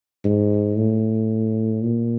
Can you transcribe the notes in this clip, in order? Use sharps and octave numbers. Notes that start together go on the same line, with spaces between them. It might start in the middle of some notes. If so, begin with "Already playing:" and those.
G#2
A2
A#2